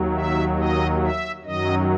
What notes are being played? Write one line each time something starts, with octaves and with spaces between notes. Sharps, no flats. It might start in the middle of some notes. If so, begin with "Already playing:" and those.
Already playing: D#2 D#3 F#3
E5
D#5
E5
F#2 D#3 F#3 D#5